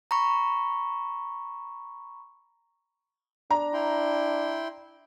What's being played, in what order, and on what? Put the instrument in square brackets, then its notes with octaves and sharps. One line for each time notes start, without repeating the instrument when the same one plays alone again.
[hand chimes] A#5 B5 C#6
[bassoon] D4 [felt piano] A#5
[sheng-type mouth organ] E4 G5 C6